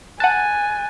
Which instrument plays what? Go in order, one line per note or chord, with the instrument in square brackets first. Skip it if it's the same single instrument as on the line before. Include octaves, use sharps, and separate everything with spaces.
[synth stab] F#5 A5 [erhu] G#5 [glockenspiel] F#6 A6 D#7